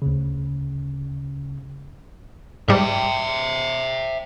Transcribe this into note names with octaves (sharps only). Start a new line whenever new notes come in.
D2 C#3
G#2 G3 E5 G5